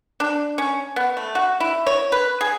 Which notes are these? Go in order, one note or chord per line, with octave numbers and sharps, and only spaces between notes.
D4
C#4
B3
A3
F#4
E4
C#5
B4
G#4